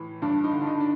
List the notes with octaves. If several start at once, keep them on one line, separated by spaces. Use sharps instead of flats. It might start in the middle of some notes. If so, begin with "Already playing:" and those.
Already playing: A2 E3
G2 D4
D#4
D3
D4
D#4
D4